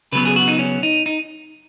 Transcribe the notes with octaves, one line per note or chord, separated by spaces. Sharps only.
C#3 F#3 B3 B4
G#4
F#4
D#4
C#4
D#4
D#4